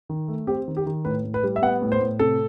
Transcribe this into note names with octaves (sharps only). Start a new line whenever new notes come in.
D#3
A3
C4 G4
D#3
G4
D#3
A2 B4
A2
B4
G3
E5
B3 F#5
A2
C5
A2
C3 A4